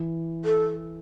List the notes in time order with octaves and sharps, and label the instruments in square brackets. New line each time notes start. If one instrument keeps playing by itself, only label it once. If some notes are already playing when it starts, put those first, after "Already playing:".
Already playing: [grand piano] E3
[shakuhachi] A4